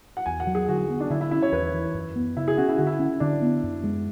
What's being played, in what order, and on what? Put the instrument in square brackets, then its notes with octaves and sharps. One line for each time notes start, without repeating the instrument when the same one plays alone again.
[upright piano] F#5
[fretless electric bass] E2 [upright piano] G#5
[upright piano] F#5
[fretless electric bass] F#3
[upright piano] G#4
[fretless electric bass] D3 [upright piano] F#4
[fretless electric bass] B3
[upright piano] D4
[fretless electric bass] D3 [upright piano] E4
[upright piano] E4
[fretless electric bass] C#4 [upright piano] E4
[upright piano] C#5
[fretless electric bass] E2 [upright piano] B4
[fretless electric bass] E3
F#2
B3
[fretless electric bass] C#3 [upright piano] E4
[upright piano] G#4
[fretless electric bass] C#4 [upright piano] F#4
[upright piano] E4
[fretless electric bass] D3 [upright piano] F#4
[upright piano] E4
[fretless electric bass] C#4
[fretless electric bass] D3 [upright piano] D4
[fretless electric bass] B3
F#2
G#3